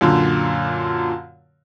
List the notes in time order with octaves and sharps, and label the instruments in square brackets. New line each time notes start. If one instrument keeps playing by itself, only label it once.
[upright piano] F#2 A#2 D3